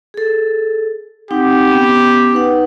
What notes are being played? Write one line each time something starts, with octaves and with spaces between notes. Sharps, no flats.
G#4 A4
C4 D#4 G4 F#5
B3 C#4
D#4 B4 F#5